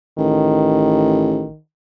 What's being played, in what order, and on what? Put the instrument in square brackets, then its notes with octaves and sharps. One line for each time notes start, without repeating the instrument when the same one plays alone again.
[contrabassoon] A1 [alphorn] D#3